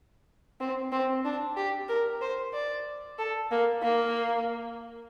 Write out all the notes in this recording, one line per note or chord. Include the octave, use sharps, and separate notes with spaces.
C4
C4
D4
G4
A#4
C5
D5
A4
A#3
A#3